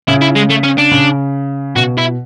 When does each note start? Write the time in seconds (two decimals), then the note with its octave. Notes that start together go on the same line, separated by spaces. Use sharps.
0.08 C#3 E4
0.22 E4
0.36 G#3
0.50 A3
0.64 C#4
0.78 D4
0.91 C#3
1.76 B2 F#4
1.98 E4